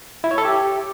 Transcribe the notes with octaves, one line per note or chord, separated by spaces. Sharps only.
E4
C#5
A4
G4